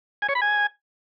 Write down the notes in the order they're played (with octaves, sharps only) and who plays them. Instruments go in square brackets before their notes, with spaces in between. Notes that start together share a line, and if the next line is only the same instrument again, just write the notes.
[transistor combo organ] G#5
C#5
B5
G#5